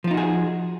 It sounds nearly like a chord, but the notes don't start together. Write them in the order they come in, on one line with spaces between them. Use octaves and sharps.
F3 F4 D#4 F#4 G#4